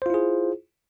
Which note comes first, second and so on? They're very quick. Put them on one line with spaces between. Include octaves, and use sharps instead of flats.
C5 F4 E4 G#4